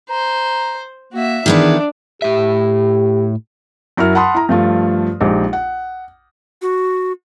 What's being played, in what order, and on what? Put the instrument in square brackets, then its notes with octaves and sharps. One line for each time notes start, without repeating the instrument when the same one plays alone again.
[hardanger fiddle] C5 [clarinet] A#5
[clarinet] A#3 [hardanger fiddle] F#4 E5
[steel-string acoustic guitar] D#3 E3 B3 [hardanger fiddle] D4 [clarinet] G#4
[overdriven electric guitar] A2 E5 [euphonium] G4
[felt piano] F#2 E4 F#4 A#4 E5 F6
F#5 A5 B5 C6 D#6
E4 A#5
G2 F3 A3 F4
A#1 G#3 D#4 G4
F#5
[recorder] F#4